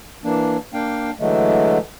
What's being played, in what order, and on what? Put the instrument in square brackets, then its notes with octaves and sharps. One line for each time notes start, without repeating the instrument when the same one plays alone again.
[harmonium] E3 A#3 D4
A#3 D4 F5 G5
D3 E3 F#3 G#3 A3